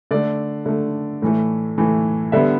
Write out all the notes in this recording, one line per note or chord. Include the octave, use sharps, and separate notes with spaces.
D3 A3 D5
D3 A3
A2 E3 A3
A2 E3 A3
D3 G3 B3 E5